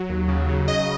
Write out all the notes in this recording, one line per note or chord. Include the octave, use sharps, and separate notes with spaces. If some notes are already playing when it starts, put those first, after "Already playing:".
Already playing: F#3
D#2
C#3
C#3
F#3 D#5